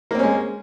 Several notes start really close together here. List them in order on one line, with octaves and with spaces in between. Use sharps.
A#3 C4 C#4 G#3